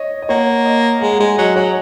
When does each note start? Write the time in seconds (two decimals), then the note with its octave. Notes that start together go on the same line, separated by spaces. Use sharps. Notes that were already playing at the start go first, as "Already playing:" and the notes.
Already playing: C#5 D#5
0.22 D#5
0.29 A#3 C#5 F#5
0.66 D#5
1.01 G#3 F#5 A#5
1.12 A#5
1.20 G#3 D#5 G#5
1.38 F#3 D#5 G#5
1.56 F#3 C#5 F#5